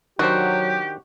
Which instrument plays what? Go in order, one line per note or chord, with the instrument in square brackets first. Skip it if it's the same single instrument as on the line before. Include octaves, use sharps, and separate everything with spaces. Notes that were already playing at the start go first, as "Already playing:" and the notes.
[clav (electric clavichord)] D#3 D4 C5 [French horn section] F#3 [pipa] F#4 [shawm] G4